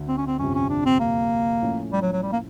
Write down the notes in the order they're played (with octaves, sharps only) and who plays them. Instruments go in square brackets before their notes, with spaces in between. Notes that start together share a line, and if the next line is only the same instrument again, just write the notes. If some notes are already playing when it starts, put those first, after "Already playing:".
Already playing: [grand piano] D2 D3
[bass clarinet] C4
C#4
C4
[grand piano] G1 F2 C3 [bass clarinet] C#4
[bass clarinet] C#4
D4
C4
A#3
[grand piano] A2 F3 A3 C#4
[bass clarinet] G3
F#3
F#3
G3
A#3